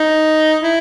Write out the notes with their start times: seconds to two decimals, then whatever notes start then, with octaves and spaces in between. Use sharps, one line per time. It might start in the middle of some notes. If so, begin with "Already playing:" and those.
Already playing: D#4
0.63 E4